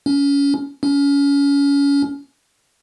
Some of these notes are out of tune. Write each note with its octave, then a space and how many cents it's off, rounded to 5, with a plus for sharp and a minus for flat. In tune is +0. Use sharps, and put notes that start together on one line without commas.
C#4 +25
C#4 +30